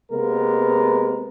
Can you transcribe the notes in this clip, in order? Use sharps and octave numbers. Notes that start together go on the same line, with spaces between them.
C3 G#3 A#3 B3 A#4